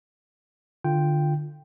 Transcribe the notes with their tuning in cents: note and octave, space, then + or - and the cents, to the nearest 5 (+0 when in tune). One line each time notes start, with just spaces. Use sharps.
D3 +20 F4 +0 G5 +0